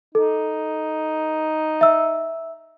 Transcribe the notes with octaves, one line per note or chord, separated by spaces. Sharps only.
D#4 A4
E5 E6